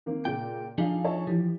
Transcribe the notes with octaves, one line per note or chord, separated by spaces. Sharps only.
D#3 A#3 C4
A#2 C#3 G5
F3 D4 D#4 G#4 F5
C#5 E5 A5
E3 F3 G4